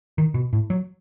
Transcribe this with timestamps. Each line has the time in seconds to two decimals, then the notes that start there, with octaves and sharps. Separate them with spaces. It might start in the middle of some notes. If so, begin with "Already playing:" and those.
0.18 D#3
0.34 B2
0.53 A2
0.70 F#3